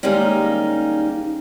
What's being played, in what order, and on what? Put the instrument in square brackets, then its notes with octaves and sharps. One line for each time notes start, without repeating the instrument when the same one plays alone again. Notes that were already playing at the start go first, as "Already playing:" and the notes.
[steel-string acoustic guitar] D#3 G3 G#3 A#3 C#4 D#4